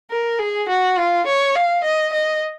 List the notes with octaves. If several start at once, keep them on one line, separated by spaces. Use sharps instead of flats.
A#4
G#4
F#4
F4
C#5
F5
D#5
D#5